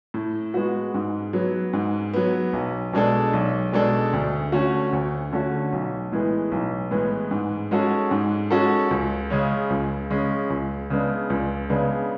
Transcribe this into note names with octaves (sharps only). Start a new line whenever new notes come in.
A2
G#3 B3 F#4
G#2
F#3 B3
G#2
F#3 B3
B1
B2 G#3 D4 A4
B1
B2 G#3 D4 A4
D2
D3 A3 C#4 F#4
D2
D3 A3 C#4 F#4
B1
A2 E3 G#3 B3
B1
A2 E3 G#3 B3
G#2
G#3 C#4 F#4 A4
G#2
G#3 C#4 F#4 A4
C#2
C#3 G#3 C#4
C#2
C#3 G#3 C#4
C#2
C#3 G#3 B3 D4
C#2
C#3 G#3 B3 D4